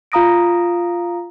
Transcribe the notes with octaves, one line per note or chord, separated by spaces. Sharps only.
F4 F5 A#5 D#6 A#6 D7